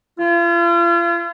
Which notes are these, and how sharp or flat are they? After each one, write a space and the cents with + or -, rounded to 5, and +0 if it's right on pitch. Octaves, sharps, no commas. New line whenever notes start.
F4 -40